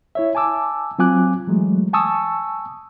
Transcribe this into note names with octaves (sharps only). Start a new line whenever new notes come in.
E4 C#5 E5
G#5 A5 D6 E6
F#3 C4 F4 G#5 D6 F#6
E3 F#3 G#3 A3
G#5 A5 C#6 D#6 E6